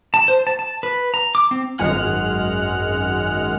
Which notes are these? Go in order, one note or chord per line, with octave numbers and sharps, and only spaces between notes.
A5
C5
A5
A5
B4
A#5
D6
C4
G#1 F#2 G#3 F#5 F6